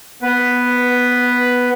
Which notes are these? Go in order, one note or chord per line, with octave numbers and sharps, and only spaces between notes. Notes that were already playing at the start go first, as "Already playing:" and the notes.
B3 B4